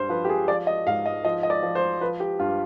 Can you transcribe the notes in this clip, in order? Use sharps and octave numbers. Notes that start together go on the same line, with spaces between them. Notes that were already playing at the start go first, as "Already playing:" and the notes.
Already playing: G2 C5
F3 B4
G4
G#4
F3 D5
D#5
G#2 F5
D#5
F3 D#5
D#5
D5
F3
C5
F3 B4
G4
G2 F4